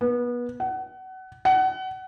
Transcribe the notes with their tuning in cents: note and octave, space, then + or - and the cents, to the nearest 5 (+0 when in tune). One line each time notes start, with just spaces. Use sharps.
B3 -25
F#5 +25
F#5 +25